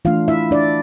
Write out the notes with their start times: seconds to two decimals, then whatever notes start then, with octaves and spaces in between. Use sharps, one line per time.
0.05 E3 A3 D4 F4 F5
0.28 E4 E5
0.51 D4 D5